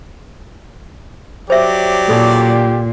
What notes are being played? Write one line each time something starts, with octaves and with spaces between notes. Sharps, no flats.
F#3 G4 C5 D5 E5
A#2 D#4 A4